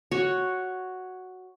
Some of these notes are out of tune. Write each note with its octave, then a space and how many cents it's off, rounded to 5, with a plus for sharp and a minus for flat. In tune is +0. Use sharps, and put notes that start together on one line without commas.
F#4 +0 C#5 +0